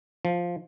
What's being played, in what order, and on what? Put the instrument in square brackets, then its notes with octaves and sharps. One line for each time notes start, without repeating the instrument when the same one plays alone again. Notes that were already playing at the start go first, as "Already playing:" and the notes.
[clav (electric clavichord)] F3